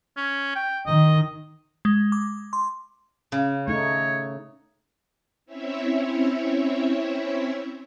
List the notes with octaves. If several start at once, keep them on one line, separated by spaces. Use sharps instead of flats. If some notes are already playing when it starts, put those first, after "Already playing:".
C#4
G5
D#3 D#5
G#3
D6
C6
C#3
A3 D#4 C#5
C4 C#4 E4 C#5 E5